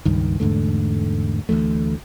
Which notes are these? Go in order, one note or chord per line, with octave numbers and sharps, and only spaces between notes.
C#2 G2 D#3
E2 G#2 D3 A3
D2 E3 F#3 A3